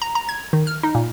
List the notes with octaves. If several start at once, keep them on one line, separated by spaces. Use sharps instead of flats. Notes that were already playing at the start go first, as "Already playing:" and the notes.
A#5
A#5
G#6
D#3
F6
D#4
A#2